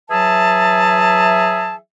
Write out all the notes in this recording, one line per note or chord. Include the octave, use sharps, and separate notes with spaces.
E3 F#3 G#4 E5 A5